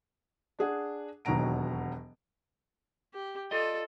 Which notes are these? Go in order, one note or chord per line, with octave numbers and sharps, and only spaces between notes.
D4 G#4 F#5
E1 D#2 B2 F#3 A#5 D7
G4
F4 A4 D5 D#5